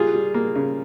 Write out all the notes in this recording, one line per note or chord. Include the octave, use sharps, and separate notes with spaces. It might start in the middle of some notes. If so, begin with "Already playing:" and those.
Already playing: G3 A#3 F4 G#4
G3
A#3
C#3